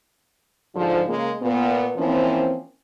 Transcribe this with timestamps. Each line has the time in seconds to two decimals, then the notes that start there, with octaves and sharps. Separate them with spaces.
0.76 G#2 D3 F3
1.08 C#3 G#3 A#3
1.42 A#2 B3
1.97 E3 F3 A#3 C4 C#4